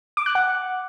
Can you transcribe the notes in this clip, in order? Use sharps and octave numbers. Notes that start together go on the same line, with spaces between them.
D6
F#6
F#5